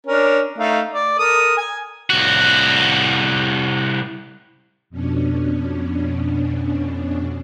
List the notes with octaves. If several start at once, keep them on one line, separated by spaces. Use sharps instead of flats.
C#4 D4 A#4
A3 D#4 F5
D5
A4 A#4 D#6
G#5
C2 F#4
F2 B2 C#4 D4